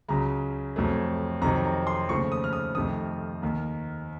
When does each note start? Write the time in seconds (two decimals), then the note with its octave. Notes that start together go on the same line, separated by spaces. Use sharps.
0.09 C#2 C#3 F#3 A#5
0.76 F2 C3 F#3 A3
1.41 F2 C3 D#3 F#3 A#5
1.65 A#5
1.87 C6
2.08 D#2 C#3 F3 A3 C#6
2.32 D#6
2.44 F6
2.53 D#6
2.75 F2 C3 D#3 A3 D#6
3.42 D#2 D#3 A#3